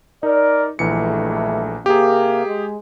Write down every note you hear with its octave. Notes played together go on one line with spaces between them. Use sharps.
D#4 A#4 D5
A#1 G2 E3 G#3 A3 C#7
C3 A#3 G4 G#4
G#3